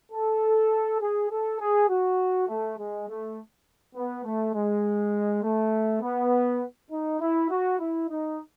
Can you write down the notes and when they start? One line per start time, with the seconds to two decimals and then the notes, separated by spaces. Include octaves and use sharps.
0.11 A4
1.00 G#4
1.29 A4
1.59 G#4
1.88 F#4
2.47 A3
2.77 G#3
3.07 A3
3.95 B3
4.24 A3
4.54 G#3
5.42 A3
6.01 B3
6.90 D#4
7.20 E4
7.49 F#4
7.79 E4
8.09 D#4